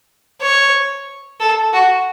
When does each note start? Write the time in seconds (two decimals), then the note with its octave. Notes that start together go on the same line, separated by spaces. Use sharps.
0.41 C#5
1.40 A4
1.73 F#4